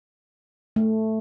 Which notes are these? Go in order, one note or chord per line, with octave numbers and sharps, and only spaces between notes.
A3